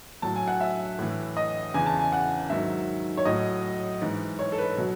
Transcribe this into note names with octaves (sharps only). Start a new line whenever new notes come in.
A2 F#3 A5
G#5
F#5
E5
A2 E3
D#5
E2 C#3 E3 G#5
A5
G#5
F#5
G#2 D#3 F#3 E5
C#5
A2 F#3 D#5
G#2 E3
C#5
A4
B4
B2 F#3